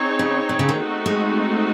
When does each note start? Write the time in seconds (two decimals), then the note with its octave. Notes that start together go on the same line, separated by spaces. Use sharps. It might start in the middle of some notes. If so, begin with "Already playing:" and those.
Already playing: C4 D#4 G#4 C#5
0.19 C#3
0.49 C3
0.59 C#3
0.69 D#3
0.79 A3 C4 D#4 F#4
1.06 G#3